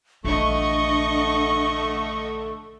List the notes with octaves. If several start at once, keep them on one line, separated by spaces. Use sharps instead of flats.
A#1 D3 E3 A3 D4 D#5 C#6